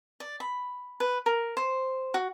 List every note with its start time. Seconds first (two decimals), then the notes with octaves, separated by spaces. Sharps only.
0.20 D5
0.40 B5
1.00 B4
1.26 A#4
1.57 C5
2.14 F#4